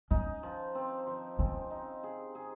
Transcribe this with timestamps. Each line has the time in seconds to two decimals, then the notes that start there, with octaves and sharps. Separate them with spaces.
0.10 C#4 D#4
0.43 F3
0.75 C4
1.07 F3
1.39 C4 C#4
1.71 D#4
2.03 G#4
2.35 G#4